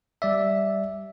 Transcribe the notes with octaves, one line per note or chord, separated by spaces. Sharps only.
G3 D5 E5